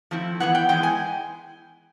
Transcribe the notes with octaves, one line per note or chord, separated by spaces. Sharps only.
F3 A3 C4 E4
E3 G#3 B3 E4 F#5
G5
E3 G#3 B3 E4 G5
G#5